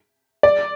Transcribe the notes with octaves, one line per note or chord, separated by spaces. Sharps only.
D5